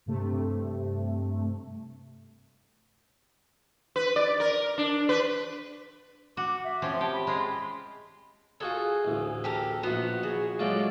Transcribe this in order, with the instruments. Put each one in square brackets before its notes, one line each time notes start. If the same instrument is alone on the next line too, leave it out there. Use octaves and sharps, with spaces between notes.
[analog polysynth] G2 C3 A3
[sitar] B4
D5
A#4
D4
B4
[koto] F#4 [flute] D6
[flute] E5
[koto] F3 C4 C#4
[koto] G4 [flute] A5
[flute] B5
[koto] G#3 F4
[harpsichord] F4 F#4 A4 [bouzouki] G#4
[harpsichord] A1 D2
[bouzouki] G4 A4 A#4
[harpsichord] A#1 C5 [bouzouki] B3 [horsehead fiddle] F#4
[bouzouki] F#4 [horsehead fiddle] G#4
[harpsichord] F#3 A3 F4 [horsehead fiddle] G#3 D5